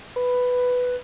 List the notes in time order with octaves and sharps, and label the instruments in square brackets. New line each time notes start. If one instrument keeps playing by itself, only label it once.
[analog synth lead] B4